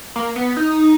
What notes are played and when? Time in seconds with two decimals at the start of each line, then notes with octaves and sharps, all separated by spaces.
0.16 A#3
0.36 B3
0.57 D#4